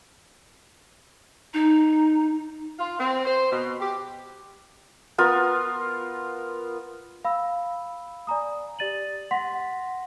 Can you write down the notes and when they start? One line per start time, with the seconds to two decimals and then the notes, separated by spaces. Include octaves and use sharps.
1.54 D#4
2.78 F4
3.00 C4
3.26 C5
3.52 B2
3.80 G4
5.18 B3 F4 A#4
7.25 F5 B5 E6
8.27 D5 G#5 A#5 D#6
8.79 G4 D5 A6 D#7 F#7
9.31 F#5 C6 A#6 B6